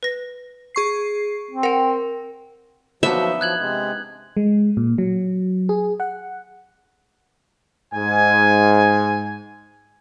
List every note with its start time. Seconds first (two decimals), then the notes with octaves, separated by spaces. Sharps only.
0.03 B4 A#6
0.75 G#4 C#6 C7
1.51 C4
1.63 A#4 F#5 G5
3.03 B2 F3 F#3 B3 D4 D#4 E5
3.41 F3 F#3 F#6 G#6 F#7
3.59 C3 G#3
4.37 G#3
4.77 A#2
4.98 F#3
5.69 G#4
6.00 F#5
7.94 G#2 G#5